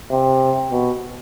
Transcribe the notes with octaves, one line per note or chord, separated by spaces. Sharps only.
C3
B2